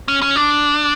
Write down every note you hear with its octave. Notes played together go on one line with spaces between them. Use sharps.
C#4
C#4
D4